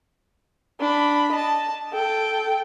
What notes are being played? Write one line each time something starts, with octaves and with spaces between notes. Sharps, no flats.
D4 B5
D#5 A5
A4 G5